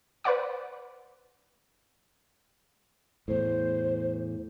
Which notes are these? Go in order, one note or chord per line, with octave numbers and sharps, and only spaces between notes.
B4 C5 D5 F#5 D6
E2 A2 C5